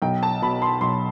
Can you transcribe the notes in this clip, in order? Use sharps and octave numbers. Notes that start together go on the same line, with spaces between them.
B1 G5
A5
B2 B5
C6
B1 C6